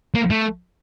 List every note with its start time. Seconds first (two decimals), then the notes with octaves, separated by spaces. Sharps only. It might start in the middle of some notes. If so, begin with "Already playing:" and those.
0.15 A#3
0.30 A3